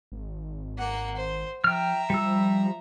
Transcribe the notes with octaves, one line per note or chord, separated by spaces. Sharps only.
G#1
A#3 F#5
C5
F3 E5 G5 A#5 F6
F3 G3 E6